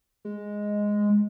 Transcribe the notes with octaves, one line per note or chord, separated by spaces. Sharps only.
G#3